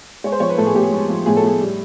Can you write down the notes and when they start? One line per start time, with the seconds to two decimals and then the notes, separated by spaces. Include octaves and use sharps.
0.24 G#3 C#5
0.32 C5
0.40 F3 C#5
0.49 B4
0.58 A2 A4
0.66 G#4
0.74 A2 G4
0.83 G#4
0.92 G#3
1.09 F3
1.26 A2 G#4
1.37 A4
1.42 A2 G#4
1.60 G3